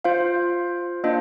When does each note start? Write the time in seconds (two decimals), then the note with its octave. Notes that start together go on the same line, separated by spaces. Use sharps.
0.05 F4 C5 F5
1.04 A#3 D4 F4 C5 D#5